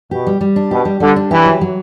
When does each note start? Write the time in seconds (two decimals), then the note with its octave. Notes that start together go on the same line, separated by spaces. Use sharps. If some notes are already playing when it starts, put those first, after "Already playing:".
0.11 B2 G4
0.27 G3
0.41 G3
0.56 D4
0.71 B2 G4
0.85 G3
1.00 D3 G3
1.16 D4
1.31 E3 G4
1.46 F#3
1.61 F#3